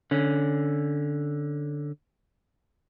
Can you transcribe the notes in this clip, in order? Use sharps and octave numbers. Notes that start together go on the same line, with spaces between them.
D3 C#4